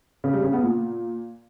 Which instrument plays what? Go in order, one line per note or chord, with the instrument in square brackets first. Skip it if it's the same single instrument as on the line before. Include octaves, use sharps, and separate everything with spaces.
[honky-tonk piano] C#3
G3
C#3
B3
A#2